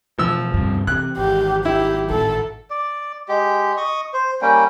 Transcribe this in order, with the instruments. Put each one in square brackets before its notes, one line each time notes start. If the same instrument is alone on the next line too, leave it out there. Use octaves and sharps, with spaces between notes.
[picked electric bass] B2 E3 A3 [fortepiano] F3 E6
[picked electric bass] D2 C3 [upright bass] G2
[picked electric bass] C3 [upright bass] E3 [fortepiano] F#6
[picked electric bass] G#1 [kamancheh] G4
[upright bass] F#3 [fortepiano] E4 [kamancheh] G4
[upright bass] A1 C4 [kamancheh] A4
[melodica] D5
G#3 G4
D#5 C#6 D#6
C5
G3 A#3 C#4 G5